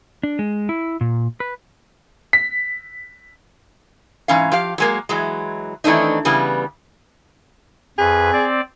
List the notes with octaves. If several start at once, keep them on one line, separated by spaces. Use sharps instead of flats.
D4
G#3
E4
A#2
B4
B6
G#2 E3 C#4 F5
F3 G4 F5
F#3 G#3 A#3
E3 F#3 G#3
D#3 E3 A3 C4 D4 D#4
C#3 E3 G3 B3
F2 G#4 B4
C4 D5